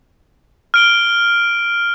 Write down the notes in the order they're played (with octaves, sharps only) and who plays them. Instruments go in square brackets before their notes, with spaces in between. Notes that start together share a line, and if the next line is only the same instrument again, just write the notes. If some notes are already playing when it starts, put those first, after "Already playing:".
[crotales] F6 D7 G7